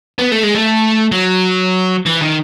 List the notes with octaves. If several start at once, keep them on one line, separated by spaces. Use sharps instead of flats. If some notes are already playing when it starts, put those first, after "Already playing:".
B3
A3
G#3
A3
F#3
E3
D#3